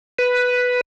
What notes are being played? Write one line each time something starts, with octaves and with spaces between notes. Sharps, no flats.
B4